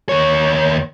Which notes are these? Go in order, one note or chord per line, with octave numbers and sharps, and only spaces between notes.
D#2 C#5